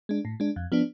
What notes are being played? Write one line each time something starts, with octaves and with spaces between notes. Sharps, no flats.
G#3 D4
A2
G#3 D4
F2
F3 B3 D4